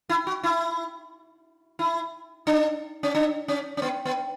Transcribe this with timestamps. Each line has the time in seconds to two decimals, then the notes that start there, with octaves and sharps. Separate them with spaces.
0.09 E4
0.27 F#4
0.43 E4
1.79 E4
2.47 D4
3.03 C#4
3.15 D4
3.48 C#4
3.77 C#4
3.82 B3
4.05 B3